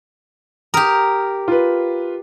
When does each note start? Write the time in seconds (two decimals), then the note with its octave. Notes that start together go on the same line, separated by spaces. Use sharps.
0.74 G4 A#4 D#6
1.48 F4 B4